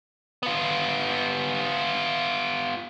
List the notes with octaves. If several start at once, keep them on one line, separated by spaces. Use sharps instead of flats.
B3 F4